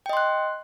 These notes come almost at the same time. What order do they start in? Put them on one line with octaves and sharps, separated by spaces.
G5 D#5 C6 F#6